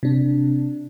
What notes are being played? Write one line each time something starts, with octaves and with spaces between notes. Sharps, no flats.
C3 D4